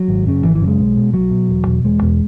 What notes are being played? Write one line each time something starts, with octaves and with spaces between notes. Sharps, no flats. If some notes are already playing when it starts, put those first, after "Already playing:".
Already playing: F#3
G#1
F#2 C#3
G#1 E3
E3
F#2 C#3
G#3
B1
B2
B1 F#3
B2
E1
E2 B2
E1 G#3
E2 B2